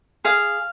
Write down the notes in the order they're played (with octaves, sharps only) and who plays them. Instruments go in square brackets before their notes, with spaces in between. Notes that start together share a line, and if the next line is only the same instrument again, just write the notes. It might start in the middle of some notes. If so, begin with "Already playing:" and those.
[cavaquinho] G#4 F5